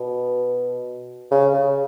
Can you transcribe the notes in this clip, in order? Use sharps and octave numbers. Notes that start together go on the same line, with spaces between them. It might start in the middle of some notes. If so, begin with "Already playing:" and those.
Already playing: B2
C#3
C#3